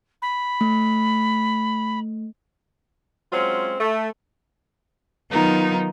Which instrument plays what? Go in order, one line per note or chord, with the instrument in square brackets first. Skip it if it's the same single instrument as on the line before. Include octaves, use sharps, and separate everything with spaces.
[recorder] B5
[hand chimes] A3
[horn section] F#3 G#3 C4 C#4 F4
A3
[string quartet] D#3 F#3 B3 D#4 F4 A#4